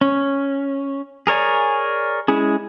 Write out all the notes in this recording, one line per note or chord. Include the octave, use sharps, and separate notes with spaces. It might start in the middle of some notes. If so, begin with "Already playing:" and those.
C#4
G#4 A#4 C#5 D5 G#5
G#3 C#4 E4 G#4